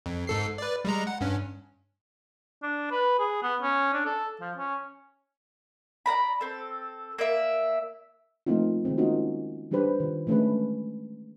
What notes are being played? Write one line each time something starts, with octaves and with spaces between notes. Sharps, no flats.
F2
G#2 A4 C7
B4 D5
G3 G#3 A#5
F#5
G2 C#4
D4
B4
G#4
B3
C#4
D4
A4
F3
C#4
D5 F5 A#5 B5
C4 A4
A#3 D5 E5
F3 A3 A#3 C4 D#4 F4
D#3 G#3 C4
A#3 C#4 D#4 F4 F#4
E3 G3 D4 G4 B4 C5
D#3 F4
E3 G#3 A3 C#4 D4 B4